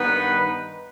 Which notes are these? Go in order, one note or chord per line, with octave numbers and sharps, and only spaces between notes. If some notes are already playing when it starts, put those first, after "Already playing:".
Already playing: G2 D#3 B3 D#4 B4